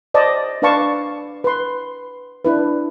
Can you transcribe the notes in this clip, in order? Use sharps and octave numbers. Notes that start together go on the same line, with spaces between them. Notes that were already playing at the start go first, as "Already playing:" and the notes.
C5 D5 D#5 A5
D4 B4 D5 F5 A5 C#6
B4 C6
D4 E4 B4